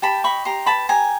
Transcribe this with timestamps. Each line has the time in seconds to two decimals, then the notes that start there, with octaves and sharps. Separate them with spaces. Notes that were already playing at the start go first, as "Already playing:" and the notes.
0.02 G4 A5 B5
0.24 D#5 B5 C#6
0.45 G4 A#5 C6
0.66 B4 A5 B5
0.89 G4 G#5 A#5